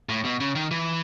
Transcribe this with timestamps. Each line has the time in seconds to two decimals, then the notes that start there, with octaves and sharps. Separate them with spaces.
0.09 A2
0.25 B2
0.40 C#3
0.55 D#3
0.71 E3